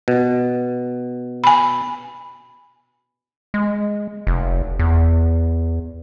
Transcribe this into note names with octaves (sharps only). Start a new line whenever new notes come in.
B2
G#5 B5
G#3
F1
E2